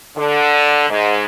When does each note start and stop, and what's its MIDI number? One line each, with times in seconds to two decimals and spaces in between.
0.17 0.86 50
0.90 1.25 44